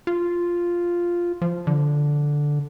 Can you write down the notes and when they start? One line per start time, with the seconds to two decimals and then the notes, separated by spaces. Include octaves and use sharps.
0.07 F4
1.42 F3
1.67 D3